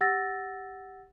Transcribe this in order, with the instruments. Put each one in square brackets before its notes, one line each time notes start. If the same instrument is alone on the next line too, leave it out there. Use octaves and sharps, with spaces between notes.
[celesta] G4 F#5 E6 A6 A#6